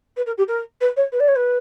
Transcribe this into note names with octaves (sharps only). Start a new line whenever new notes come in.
B4
A#4
G4
A#4
B4
C#5
B4
D5
C#5
B4